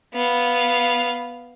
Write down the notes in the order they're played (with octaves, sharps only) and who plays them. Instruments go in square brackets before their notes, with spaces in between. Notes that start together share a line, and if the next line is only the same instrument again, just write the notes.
[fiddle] B3 F5